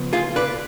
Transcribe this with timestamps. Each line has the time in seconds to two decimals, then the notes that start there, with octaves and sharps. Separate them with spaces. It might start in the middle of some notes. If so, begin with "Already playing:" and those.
Already playing: C#3 F3 B3
0.13 F4 G#4
0.36 B4 D5